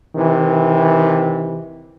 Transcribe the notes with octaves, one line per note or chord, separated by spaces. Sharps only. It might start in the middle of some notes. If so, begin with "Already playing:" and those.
C3 D#3 E3